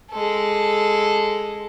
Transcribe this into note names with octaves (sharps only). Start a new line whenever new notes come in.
G#3 A4